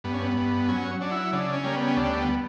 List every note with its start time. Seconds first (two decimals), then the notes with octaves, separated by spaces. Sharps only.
0.04 G2 B3
0.14 C#4
0.22 B3
0.37 G2
0.68 F#3 C#4
1.01 F#3 D4
1.11 E4
1.33 C#3 D4
1.53 C#4
1.64 G3 A#3
1.76 B3
1.87 C#4
1.97 D2 D4
2.17 B3